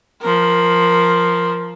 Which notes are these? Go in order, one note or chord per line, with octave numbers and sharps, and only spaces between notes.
F3 A#4